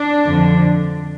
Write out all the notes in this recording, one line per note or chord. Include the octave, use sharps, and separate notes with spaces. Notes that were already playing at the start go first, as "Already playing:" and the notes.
Already playing: D4
F2 D3 F3